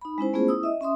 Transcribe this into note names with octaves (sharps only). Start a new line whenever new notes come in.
D#4 B5
G#3 C#4 E4 C5
A3 B3 C#4 F4 G#4 C5
E4 D#6 E6
D#5 E5
C#4 E5 C6 D#6